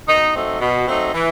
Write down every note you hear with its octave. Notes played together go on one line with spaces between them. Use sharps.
B2 D#4
F#3 A3 C4 D#4
B2
F#3 A3 C4 D#4
E3